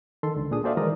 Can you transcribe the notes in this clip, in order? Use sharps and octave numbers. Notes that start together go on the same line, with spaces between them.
D#3 A4 C6
C#2 D3
A#2 D4 G#4 D#6
F#4 A4 C5 D5 E5 F5
D#3 E3 G#3 A#4 D5 D#6